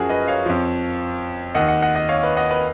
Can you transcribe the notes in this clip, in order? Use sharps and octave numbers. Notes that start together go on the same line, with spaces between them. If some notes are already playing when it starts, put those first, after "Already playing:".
Already playing: F#2 F3 F#4 G#4 A#4
B4 D#5
C#5 F5
F2 F3
D#2 D#3 D#5 F#5
D#5 F#5
D#5 F#5
D#5 F#5
C#5 F5
B4 D#5
D#5 F#5
B4 D#5